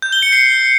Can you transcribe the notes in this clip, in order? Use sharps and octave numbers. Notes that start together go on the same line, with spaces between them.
G6
G7
C#7
C7